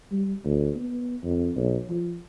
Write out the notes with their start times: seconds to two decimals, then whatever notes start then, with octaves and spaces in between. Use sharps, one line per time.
0.12 G3
0.44 D2
0.76 B3
1.23 F2
1.56 B1
1.89 F3